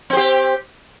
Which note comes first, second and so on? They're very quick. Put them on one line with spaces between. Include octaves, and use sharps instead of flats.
C4 C5 G4